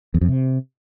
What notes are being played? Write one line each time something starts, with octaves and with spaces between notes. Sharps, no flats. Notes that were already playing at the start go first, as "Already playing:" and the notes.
E2
F2
C3